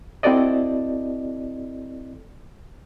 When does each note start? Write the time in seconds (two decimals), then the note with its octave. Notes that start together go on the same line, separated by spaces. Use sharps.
0.23 C4 E4 F#4 A4 D5 D#5